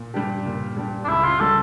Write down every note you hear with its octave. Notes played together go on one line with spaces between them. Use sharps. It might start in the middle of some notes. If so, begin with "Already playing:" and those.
Already playing: A#2
G3 D4 G4
A#2
G3 D4 G4
D4
C#2 E4
F4
C#3 G3 C#4 A4